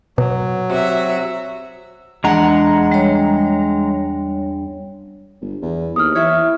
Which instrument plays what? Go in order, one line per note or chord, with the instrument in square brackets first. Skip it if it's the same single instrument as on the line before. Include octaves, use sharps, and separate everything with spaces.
[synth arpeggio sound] B2 [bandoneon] F#3
[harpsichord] C3 [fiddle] F#4 E5
[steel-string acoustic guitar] E2 D4 F#5 [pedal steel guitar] G#3 A#5
[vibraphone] G3 C#5
[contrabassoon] G1
E2
[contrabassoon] D#2 [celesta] D#6 F6
[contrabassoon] E3 [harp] C#5 E5